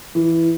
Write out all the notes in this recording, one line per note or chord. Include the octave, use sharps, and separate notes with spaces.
E3